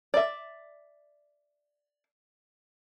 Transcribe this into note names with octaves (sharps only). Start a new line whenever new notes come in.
D5 E5